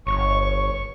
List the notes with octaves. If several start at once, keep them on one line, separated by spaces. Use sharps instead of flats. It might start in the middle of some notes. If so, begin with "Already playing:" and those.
G1 C#5 C#6